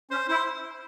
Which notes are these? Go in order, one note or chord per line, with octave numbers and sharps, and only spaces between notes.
C#4 C5
E4 C5